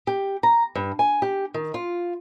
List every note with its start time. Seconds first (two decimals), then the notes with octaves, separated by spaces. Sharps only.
0.07 G4
0.43 A#5
0.75 G2
0.99 G#5
1.22 G4
1.54 D#3
1.74 F4